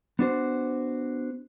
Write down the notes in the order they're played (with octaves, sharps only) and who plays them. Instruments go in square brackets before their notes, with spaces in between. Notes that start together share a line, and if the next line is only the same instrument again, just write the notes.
[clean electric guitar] B3 D4 F#4 C5